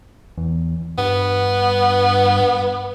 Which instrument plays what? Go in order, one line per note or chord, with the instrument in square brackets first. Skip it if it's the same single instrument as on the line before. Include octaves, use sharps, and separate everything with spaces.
[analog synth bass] E2
[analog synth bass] G2 [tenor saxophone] B3